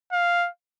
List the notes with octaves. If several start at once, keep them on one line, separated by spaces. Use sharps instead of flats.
F5